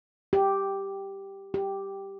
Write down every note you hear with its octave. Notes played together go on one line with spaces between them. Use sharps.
G4
G4